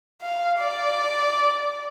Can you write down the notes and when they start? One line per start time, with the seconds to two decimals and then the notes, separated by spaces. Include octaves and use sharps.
0.22 F5
0.59 D5